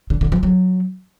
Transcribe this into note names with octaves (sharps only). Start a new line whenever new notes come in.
D3
D3
F3
F#3